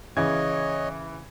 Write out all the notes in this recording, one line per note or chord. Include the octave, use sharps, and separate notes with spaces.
C#3 E3 C#5 D#5 G#6